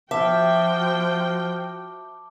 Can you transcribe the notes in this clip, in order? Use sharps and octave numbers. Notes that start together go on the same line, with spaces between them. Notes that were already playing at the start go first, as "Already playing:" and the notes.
F3 F#4 E5 G5 A5 D6